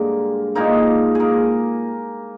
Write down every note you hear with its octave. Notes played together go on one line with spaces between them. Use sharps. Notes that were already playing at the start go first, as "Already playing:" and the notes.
Already playing: G2 D3 G#3 A#3 A#4
A#2 G#3 A#3 D#4 A#4
A#3 G#4 A#4